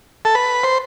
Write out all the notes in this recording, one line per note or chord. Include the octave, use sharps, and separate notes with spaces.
A4
B4
C5